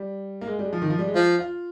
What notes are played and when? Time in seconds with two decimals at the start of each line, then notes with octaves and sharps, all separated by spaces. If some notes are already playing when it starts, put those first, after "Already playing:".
Already playing: G3
0.41 A#3
0.47 G#3
0.59 G3
0.64 G#3
0.73 F3
0.82 D#3
0.90 F3
0.99 G3
1.07 G#3
1.15 F3
1.39 F4